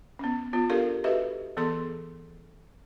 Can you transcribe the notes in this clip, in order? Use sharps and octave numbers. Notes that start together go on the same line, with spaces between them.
B3 C#4
B3 F4
D4 G4 A4 A#4 D5 F5
F#4 G4 A4 B4 D#5 E5
E3 B3 G#4 A4 C6